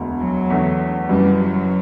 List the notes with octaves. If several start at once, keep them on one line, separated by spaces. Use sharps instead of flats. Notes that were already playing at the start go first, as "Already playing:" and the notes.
Already playing: E1 D2 D3
F#3
E2 D3 A3
F#1 F#2 E3 G3
F#3